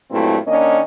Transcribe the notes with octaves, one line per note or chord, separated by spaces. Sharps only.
G2 A#2 F#3 A3 C4 E4
D#3 A#3 C#4 D4 D#5